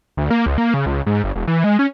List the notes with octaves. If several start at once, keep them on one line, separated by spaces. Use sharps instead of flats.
D2
A#3
C#2
A#3
C#3
C#2
G#2
G1
E1
E3
G#3
C#4